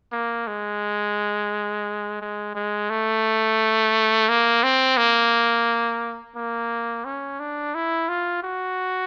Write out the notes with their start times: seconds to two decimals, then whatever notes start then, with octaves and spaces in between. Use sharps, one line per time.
0.12 A#3
0.48 G#3
2.21 G#3
2.55 G#3
2.90 A3
4.29 A#3
4.63 C4
4.97 A#3
6.36 A#3
7.05 C#4
7.40 D4
7.75 E4
8.09 F4
8.43 F#4